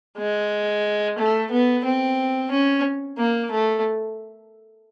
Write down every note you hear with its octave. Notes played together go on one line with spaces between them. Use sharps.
G#3
A3
B3
C4
C#4
A#3
A3